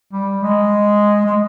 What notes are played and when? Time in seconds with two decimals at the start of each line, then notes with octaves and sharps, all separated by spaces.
0.13 G3
0.43 G#3
1.26 G#3